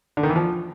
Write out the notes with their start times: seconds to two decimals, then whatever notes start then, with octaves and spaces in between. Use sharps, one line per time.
0.17 D3
0.23 D#3
0.29 E3
0.36 F3